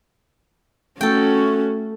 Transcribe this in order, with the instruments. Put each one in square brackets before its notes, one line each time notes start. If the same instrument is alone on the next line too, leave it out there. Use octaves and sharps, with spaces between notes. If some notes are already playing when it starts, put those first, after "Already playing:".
[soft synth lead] A3 [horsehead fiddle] C#4 F#4 [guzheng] A4 G5